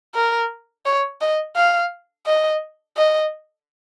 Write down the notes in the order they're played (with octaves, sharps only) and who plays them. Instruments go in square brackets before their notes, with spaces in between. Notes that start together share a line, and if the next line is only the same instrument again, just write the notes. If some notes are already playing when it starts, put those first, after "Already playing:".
[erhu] A#4
C#5
D#5
F5
D#5
D#5